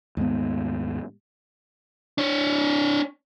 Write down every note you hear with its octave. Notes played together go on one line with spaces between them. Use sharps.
D#2 G#2 G#3 B3
D4 C#5